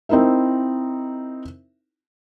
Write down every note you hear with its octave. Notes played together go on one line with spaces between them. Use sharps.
C4 D#4 E4 A#4 E5